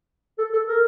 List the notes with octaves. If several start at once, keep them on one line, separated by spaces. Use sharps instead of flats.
A4
A4
A#4